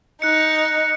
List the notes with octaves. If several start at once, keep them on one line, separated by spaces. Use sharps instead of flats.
D#4 F#6 C#7